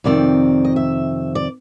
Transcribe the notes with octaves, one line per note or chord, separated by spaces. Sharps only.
F2 C3 D#3 C4 D5
D#5
E5
D5